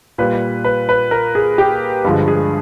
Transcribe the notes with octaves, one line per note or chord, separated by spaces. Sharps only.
A#2 G3 B4
B4
B4
A#4
G#4
G4
G2 D3 F3 G#3
G#4